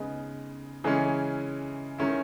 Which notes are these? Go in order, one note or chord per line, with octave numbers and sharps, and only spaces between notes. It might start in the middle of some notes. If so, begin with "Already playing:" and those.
Already playing: C#3 G#3 B3 D#4
C#3 E3 G#3 C#4
D#3 G#3 C#4 E4